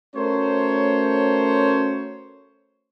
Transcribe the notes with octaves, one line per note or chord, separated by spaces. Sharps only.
A3 C#4 F#4 A#4 C5 C#5